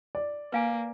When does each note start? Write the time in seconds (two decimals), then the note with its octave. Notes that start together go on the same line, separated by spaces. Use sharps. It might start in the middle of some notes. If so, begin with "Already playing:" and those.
0.15 D5
0.52 A#3 B4 F5 G#5